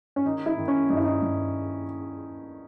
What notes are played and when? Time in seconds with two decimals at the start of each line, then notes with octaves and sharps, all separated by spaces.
0.16 C#4
0.25 D#3 D#4
0.46 E4
0.58 D#3
0.68 C#4
0.89 G2 D#4
0.97 E4
1.04 D#4
1.22 G2